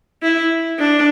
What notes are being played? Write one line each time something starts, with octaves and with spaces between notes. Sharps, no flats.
E4
D4